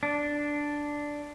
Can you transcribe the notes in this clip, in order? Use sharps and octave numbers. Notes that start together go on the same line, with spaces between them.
D4